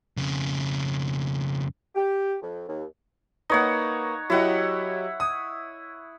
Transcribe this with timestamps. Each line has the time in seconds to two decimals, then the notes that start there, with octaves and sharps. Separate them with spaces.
0.17 F2 C#3
1.95 G4
2.42 F2
2.68 D#2
3.50 A#3 D#4 B4 C#5 F#5
4.30 F#3 E4 G4 D#5 F#5
5.20 D#6